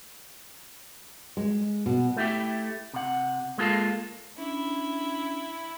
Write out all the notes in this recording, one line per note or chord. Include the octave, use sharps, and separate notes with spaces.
G#3
B2
A3 E4 G4
C3 F#5
G#3 A#3 F4 A4
C#4 D4 E4